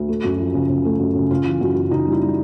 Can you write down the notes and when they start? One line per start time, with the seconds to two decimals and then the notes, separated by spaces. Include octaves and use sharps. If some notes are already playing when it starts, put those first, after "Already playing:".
Already playing: D2
0.09 A3
0.24 F#2
0.39 F3
0.54 C#3
0.70 C#3
0.85 A3
1.00 F#2
1.15 C#3
1.31 C#3 F4
1.46 E3
1.61 F#2 F#4
1.76 F#2
1.91 C#3 D#4
2.07 G3
2.12 E4
2.22 G3